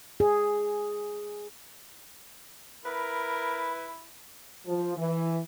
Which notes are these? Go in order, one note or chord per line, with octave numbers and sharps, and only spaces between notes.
G#4
E4 A#4 B4
F3
E3